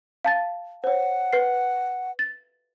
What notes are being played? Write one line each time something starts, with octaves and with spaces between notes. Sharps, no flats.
F5 A5 A6
C5 C#5 F#5
B4 C7
A6